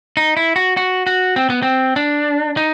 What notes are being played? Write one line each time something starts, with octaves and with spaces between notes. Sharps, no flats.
D#4
E4
F#4
F#4
F#4
C4
B3
C4
D4
D#4